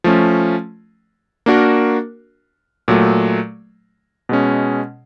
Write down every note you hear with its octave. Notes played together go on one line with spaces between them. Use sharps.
F3 A3 C#4
A#3 D4 F#4 A#4
A#2 F#3 A3
B2 G#3 C#4